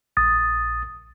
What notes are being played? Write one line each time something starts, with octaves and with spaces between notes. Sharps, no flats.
A#1 D#6 A6